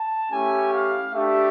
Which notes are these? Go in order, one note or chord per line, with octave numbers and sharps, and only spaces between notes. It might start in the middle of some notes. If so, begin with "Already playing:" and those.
Already playing: A5
A3 C#4 E4 G4 G#5
F5
A3 D4 G4 E5